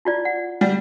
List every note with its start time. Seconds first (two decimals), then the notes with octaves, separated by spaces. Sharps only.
0.05 E4 F4 D5
0.25 F#5
0.61 G3 F#5